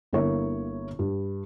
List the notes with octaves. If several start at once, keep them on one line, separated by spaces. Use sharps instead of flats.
G1 A#3 E4 C#5
G2